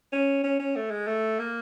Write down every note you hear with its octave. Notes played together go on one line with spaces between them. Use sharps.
C#4
C#4
C#4
A3
G#3
A3
A#3